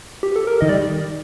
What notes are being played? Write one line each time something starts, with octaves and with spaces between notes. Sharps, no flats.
G4
A4
A#4
D#3 D#5
G3 D5